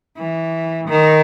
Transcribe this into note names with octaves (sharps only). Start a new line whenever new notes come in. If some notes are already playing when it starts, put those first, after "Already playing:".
E3
D#3